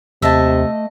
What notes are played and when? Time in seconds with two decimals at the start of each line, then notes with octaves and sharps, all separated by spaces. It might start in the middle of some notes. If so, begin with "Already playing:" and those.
0.22 D#2 C3 A3 D#5 E5 A5